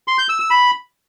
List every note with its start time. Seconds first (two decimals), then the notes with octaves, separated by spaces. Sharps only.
0.08 C6
0.18 G6
0.29 E6
0.40 E6
0.50 B5